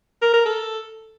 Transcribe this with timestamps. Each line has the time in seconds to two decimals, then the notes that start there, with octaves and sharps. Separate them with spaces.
0.22 A#4
0.34 A#4
0.46 A4